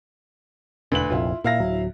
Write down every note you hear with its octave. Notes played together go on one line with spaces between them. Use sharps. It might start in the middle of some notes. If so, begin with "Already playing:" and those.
E1 D2 B4 F#7
F1 A#1 F2 E4 F4
A#2 E4 F5 A#6
D1 F#3